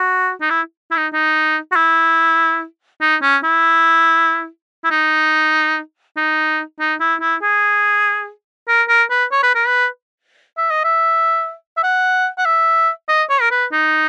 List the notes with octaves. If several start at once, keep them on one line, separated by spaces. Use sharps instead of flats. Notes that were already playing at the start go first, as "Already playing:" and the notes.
Already playing: F#4
D#4
E4
E4
D#4
D#4
F#4
E4
D#4
C#4
E4
E4
D#4
D#4
D#4
E4
E4
G#4
A#4
A#4
B4
C#5
B4
A#4
B4
E5
D#5
E5
E5
F#5
F#5
E5
D#5
C#5
A#4
B4
D#4